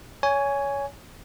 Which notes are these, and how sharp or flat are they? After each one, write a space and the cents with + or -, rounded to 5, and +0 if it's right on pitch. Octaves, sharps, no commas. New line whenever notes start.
C#5 +20 G#5 +0